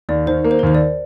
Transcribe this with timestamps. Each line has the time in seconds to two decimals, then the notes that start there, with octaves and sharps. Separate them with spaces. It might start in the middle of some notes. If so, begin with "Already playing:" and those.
0.09 D#2 D5
0.27 D#3 C5
0.44 A#3
0.51 C5
0.59 A#4
0.63 D#2 C5
0.75 D5